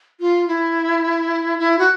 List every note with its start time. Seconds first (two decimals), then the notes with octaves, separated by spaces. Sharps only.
0.20 F4
0.48 E4
1.59 E4
1.79 F#4